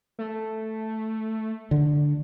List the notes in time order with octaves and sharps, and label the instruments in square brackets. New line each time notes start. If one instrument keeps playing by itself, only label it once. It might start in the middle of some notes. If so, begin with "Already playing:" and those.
[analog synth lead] A3
[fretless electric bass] D3